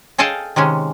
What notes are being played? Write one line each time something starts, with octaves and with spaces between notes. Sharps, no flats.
G#4 A4 D#5 F5 G5 A5
C3 D#3 G#3 C#4